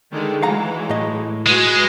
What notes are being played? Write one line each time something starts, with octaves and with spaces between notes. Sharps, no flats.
D3 D#3 G#3
E3 F#3 G#3 F5 F#5 A#5
A2 D#5
G#3 F#4 B4